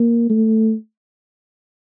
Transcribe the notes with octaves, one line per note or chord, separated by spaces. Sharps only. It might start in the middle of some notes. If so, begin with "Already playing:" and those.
Already playing: A#3
A3